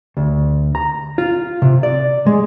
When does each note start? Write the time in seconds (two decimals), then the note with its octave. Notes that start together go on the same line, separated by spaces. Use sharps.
0.17 D2
0.75 A#5
1.18 F4
1.62 C3
1.83 D5
2.26 G#3